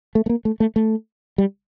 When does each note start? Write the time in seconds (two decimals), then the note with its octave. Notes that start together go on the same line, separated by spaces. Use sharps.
0.15 A3
0.26 A3
0.29 A#3
0.45 A3
0.60 A3
0.76 A3
1.38 G3